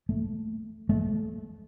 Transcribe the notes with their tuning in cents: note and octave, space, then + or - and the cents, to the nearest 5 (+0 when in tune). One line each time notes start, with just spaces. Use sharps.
A3 -5
A3 -25